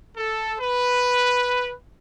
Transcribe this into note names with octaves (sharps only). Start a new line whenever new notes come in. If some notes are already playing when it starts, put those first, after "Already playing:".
A4
B4